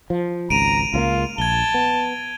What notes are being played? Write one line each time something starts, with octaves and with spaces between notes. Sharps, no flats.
F3
G#1 C#2 A#5 D7 D#7 F7
C#2 F3 A#3 F4
A#1 A5 G#6 G7
B3